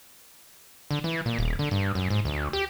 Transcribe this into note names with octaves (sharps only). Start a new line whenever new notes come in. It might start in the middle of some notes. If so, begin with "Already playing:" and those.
D3
E3
A#2
D#1
D3
G2
F#2
G#2
D2
G4